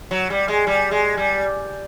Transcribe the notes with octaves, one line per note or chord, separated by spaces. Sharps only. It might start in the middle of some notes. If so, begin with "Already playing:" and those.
F#3
G3
G#3
G3
G#3
G3